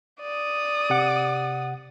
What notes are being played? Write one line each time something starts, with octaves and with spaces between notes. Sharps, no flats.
D5 D#6
C3 F#5